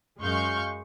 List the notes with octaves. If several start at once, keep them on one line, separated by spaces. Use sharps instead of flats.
F#2 G#3 F5 C#6 G6